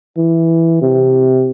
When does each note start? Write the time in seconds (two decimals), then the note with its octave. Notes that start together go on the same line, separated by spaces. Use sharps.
0.18 E3
0.82 C3